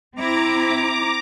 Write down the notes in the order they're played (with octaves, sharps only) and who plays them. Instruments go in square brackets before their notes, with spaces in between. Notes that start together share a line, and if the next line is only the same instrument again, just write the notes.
[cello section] C4 E4 [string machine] A#5 D6